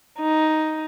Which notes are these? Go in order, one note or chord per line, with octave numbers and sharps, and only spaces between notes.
D#4